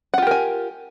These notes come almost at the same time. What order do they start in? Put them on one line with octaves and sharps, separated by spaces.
F#5 F4 G4 A#4 G#5